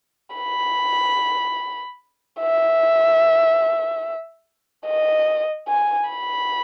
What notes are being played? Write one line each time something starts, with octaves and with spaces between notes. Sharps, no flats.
B5
E5
D#5
G#5
B5